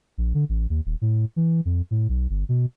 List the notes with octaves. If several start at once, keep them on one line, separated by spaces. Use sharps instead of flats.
A#1
D3
A1
D#2
D#1
A2
E3
F2
A2
B1
G1
B2